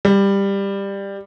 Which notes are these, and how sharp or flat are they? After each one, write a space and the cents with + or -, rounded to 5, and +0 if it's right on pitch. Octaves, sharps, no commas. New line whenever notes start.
G3 +15